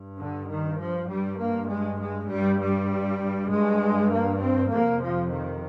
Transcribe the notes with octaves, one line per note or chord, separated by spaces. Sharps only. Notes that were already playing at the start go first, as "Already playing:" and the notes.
Already playing: G2
D3
D#3
F3
G2 G3
A#3
G#3
G#3
G2 G3
G3
G2 G#3
A#3
C4
F2 C3 A#3
F3
D#3